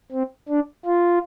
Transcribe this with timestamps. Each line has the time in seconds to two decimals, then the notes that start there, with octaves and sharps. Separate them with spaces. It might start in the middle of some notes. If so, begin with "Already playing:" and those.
0.12 C4
0.49 D4
0.85 F4